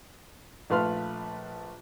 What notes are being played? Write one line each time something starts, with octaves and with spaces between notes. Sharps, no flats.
A#1 A3 B4 F5 C6 F6